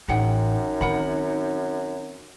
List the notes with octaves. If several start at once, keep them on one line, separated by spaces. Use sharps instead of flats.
A1 F#2 D#4 G#4 F#5 G5
D#3 C4 A#4 F#5 B5